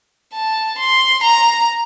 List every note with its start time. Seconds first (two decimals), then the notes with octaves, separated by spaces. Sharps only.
0.34 A5
0.78 C6
1.23 A#5